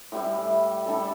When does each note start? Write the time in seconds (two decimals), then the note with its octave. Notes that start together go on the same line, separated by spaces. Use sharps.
0.12 A2 G3 E4
0.86 A2 G3 D4 A4